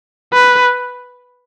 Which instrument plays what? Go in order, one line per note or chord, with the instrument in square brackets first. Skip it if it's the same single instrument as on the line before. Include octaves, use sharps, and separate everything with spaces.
[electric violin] B4